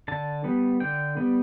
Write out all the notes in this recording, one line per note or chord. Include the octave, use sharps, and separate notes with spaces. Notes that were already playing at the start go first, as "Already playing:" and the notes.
D3 A5
G3 B3
D3 G5
G3 B3